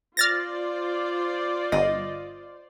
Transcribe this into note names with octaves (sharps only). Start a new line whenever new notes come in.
F4 C5 D5 F6 A6 A#6
G1 D#5